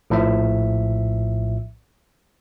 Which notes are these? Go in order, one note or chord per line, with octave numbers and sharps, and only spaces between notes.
A#1 A2 F3 E5